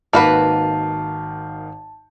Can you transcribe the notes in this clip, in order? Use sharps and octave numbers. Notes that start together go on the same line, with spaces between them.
G#1 D#3 A#3 F#4 B4 F5 A5